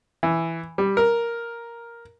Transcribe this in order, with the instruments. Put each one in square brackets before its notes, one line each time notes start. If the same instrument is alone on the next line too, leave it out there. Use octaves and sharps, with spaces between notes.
[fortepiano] E3
G3
A#4